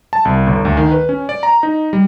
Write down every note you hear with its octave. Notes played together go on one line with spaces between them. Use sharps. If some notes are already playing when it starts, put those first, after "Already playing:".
A5
C2
G1
D2
D#3
B4
C#4
D5
A#5
D#4
G3